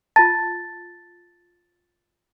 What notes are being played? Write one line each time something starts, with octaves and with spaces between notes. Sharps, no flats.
F4 A5 A6